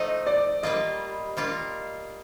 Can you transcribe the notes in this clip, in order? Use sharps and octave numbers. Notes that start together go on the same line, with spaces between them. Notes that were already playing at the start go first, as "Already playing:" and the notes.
Already playing: F3 A3 D#4 D#5
D5
G3 A#3 F4 D#5
G3 A#3 F4